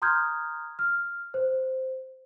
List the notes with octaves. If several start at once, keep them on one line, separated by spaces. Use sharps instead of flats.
A#5 C6 D#6 F6 G6 G#6
F6
C5